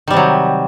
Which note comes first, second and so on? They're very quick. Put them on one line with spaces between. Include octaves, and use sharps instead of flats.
D#3 G3 C3 F#3